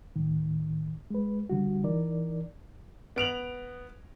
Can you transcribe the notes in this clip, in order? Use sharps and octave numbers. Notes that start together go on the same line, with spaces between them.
D2 A2 D#3
G#3 B4
D3 G3 F#4
E3 D#4 A#4 D5
B3 D7 F7 F#7